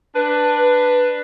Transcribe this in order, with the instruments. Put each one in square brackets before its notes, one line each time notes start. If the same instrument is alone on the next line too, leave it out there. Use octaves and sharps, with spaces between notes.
[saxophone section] D4 B4